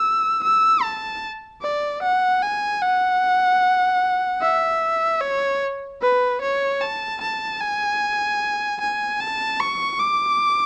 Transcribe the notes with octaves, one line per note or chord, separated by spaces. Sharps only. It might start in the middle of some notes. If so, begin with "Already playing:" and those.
Already playing: E6
E6
A5
D5
F#5
G#5
F#5
E5
C#5
B4
C#5
A5
A5
G#5
G#5
A5
C#6
D6